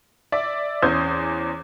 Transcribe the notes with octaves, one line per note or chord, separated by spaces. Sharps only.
D5 E5 D6
E2 C#4 C5 D#6 G6 G#6